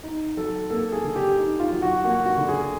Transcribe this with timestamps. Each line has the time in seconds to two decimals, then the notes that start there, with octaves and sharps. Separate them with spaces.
0.03 D#4
0.37 F#3 A4
0.70 A#3 A4
0.92 G#4
1.04 D3
1.16 G4
1.38 D#4
1.60 F4
1.71 F#3
1.82 F#4
2.04 A#3 F#4
2.26 F#4
2.37 D3
2.49 G#4